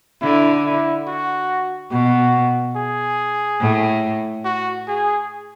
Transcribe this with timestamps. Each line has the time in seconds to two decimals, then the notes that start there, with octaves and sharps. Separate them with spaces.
0.22 D3 E4
0.65 E4
1.08 F#4
1.91 B2 F#4
2.76 G#4
3.61 A2
4.45 F#4
4.88 G#4